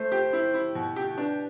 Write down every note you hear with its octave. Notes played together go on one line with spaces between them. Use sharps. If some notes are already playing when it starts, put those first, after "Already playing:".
Already playing: A3 C5
G4
E4
E4
B2
G4
D4 B4